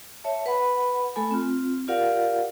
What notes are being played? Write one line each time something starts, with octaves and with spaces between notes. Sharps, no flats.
C#5 E5 A5
B4 F#5 B5
A3 A4 G#5 B5
C4 F4
F4 G4 A#4 D5 F5 F#5